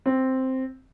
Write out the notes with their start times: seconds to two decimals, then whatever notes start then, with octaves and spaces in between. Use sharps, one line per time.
0.06 C4